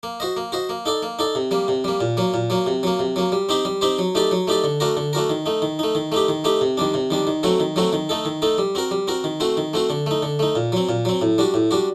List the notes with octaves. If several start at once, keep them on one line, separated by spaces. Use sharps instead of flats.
A#3
F#4 C5 D#5
A#3
F#4 C5 D#5
A#3
D#4 A4 D5
A#3
D#4 A4 D5
C3
G3 A#3
C3
G3 A#3
A#2
F#3 A#3
A#2
F#3 A#3
C3
F#3 A#3
C3
F#3 A#3
G3
C4 D#4 G4 C5
G3
C4 D#4 G4 C5
F#3
A3 D#4 G4 D5
F#3
A3 D#4 G4 D5
D3
A3 D4 F#4 A#4
D3
A3 D4 F#4 A#4
D#3
A3 D#4
D#3
A3 D#4
D#3
A3 D#4 G4
D#3
A3 D#4 G4
C3
D#3 G3 D4
C3
D#3 G3 D4
D#3
F#3 A3 C4 F#4
D#3
F#3 A3 C4 F#4
D#3
A3 D#4 A4
D#3
A3 D#4 A4
G3
C4 F#4 A#4
G3
C4 F#4 A#4
D#3
A3 C4 F#4 C5
D#3
A3 C4 F#4 C5
D3
A3 D#4
D3
A3 D#4
A#2
F#3 C4
A#2
F#3 C4
A2
G3 D4 F#4
A2
G3 D4 F#4